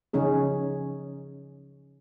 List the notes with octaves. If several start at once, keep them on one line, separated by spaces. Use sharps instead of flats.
C#3 F3 C#4 D#4 G#4